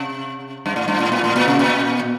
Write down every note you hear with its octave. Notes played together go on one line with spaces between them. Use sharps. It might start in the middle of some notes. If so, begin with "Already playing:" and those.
Already playing: C3
G2
A2
G2
A2
A#2
A2
A#2
C3
A#2